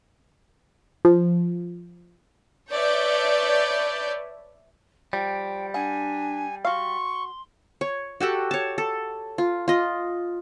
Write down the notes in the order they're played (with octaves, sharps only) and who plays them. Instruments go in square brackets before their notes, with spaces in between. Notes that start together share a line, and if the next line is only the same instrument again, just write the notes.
[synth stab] F3
[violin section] B4 C#5 D5 E5 A5 G6
[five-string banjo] F3 [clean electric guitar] G3 [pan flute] G5
[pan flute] D4 [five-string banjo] F#5 [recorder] G#5
[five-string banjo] F#4 F5 [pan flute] C6 [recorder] C#6
[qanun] C#5
F#4 G4 A4 F#5
C#5 A5
A4
F4
F4 D#5